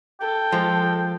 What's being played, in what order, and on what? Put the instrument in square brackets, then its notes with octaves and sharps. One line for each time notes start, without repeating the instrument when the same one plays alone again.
[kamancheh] A4 [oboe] G5
[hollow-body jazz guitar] F3 G#3